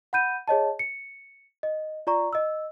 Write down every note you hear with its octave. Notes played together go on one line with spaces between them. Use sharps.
F#5 B5 G6 D#7
G#4 C#5 D#5 A5
C#7
D#5
F4 D5 A#5 C#6
D#5 E6